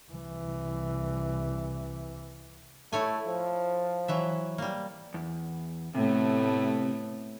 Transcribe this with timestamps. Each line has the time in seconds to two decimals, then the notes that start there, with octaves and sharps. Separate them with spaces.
0.13 C2 E3
2.93 A3 E4 C#5 G#5
3.27 F3
4.08 E3 F#3 E5
4.58 G3 A#3
5.14 E2
5.95 A2 C3 A3 B3